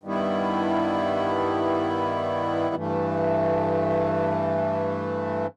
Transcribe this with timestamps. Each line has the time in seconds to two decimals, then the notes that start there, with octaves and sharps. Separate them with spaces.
0.03 G2 D#3 G3 B3 E4
2.75 G2 E3 A3